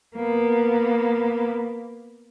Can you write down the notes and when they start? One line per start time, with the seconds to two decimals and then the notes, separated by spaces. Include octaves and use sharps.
0.15 A#3 B3